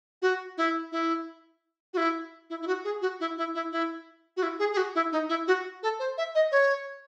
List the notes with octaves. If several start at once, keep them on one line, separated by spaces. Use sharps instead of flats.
F#4
E4
E4
F#4
E4
E4
E4
F#4
G#4
F#4
E4
E4
E4
E4
F#4
E4
G#4
G#4
F#4
E4
D#4
E4
F#4
A4
C5
E5
D#5
C#5